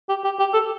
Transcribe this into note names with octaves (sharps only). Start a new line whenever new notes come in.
G4
G4
G4
A4